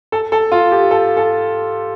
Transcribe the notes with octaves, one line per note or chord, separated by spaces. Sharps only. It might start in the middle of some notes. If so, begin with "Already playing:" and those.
A4
A4
F4
G4
A4
A4